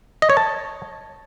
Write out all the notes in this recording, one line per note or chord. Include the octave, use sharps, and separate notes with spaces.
D#5
C#5
A5